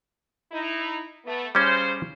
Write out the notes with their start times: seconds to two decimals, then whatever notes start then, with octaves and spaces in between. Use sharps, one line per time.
0.52 D#4 E4
1.25 A3 B3
1.55 C#3 G3 C#4 C5